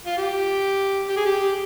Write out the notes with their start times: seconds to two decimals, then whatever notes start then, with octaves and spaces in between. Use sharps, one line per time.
0.07 F4
0.18 G4
1.09 G4
1.17 G#4
1.26 G4